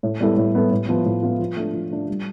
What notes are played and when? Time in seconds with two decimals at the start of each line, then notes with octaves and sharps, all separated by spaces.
0.03 A2
0.20 G3 B3 E4 A4
0.37 A2
0.54 G3 B3 E4 A4
0.71 A2
0.89 F3 B3 F4
1.05 A2
1.23 F3 B3 F4
1.39 F3
1.57 A3 D4
1.74 F3
1.91 A3 D4
2.08 G3